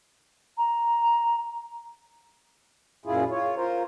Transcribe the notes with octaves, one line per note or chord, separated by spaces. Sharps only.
A#5
F#2 A#2 E4 F4 G#4
F4 C#5
F4 A#4 C5